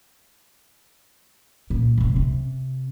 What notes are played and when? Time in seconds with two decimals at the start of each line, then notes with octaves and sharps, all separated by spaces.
1.70 A#2
1.98 F#1 C3
2.16 C3